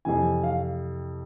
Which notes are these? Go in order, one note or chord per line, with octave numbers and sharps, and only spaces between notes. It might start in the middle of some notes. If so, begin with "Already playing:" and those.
F2 C3 E3 G#5
F5